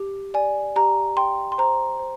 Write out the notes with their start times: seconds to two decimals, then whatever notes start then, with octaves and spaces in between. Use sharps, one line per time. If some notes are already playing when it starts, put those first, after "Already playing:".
Already playing: G4
0.34 D5 G#5
0.76 G4 A#5
1.17 G5 C6
1.52 C6
1.58 C5 A#5
1.99 C5